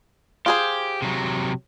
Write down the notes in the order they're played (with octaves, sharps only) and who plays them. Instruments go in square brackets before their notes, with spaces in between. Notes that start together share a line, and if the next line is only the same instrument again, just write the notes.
[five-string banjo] F4 G#4 C5 [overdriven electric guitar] G4
[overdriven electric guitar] C3 F#3